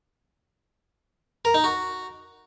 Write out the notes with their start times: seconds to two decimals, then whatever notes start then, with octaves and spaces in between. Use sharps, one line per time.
1.45 A#4
1.54 D#4
1.64 F#4